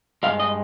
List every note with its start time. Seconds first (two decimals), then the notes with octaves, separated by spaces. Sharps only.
0.23 G2 D#3 G#3 F5
0.40 D#5